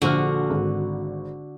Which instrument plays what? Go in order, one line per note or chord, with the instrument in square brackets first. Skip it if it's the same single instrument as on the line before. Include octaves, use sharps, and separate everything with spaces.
[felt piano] A#1 C5 F6 [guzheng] D3 F#4
[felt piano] G#1